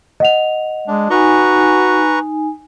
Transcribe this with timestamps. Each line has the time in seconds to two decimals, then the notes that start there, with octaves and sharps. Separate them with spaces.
0.20 D#5 F#5 F7
0.88 G#3 D4
1.10 D#4 F#4 B4 G#5 A#5 C#6